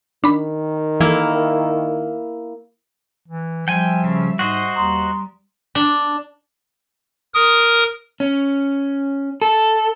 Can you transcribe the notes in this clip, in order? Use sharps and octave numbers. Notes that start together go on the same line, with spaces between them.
D#3 D4 B5
E3 A#3 E4
E3
F3 G3 E5 G5 G#5
C#3
G#2 F#4 C5 D#5
D#2 G3 A#5 C6 D#6
D4
A#4 D#6
C#4
A4